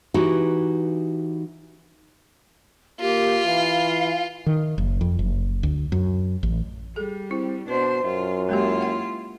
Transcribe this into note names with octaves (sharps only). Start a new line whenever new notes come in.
E3 D#4 E4 F#4 G4 B4
A#3 F4 G4
E3 F5
D#3
F#1
F2
F#1
D2
F#2
A1
G3 G#4 A4
C4 E4
B2 D4 B4 C5
F#2 F4
G#3 A#3 E4 F4 G4
A#3 E5 F#5